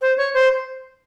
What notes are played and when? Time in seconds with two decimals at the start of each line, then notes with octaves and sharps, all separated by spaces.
0.01 C5
0.17 C#5
0.33 C5